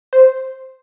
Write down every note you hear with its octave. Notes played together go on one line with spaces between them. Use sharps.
C5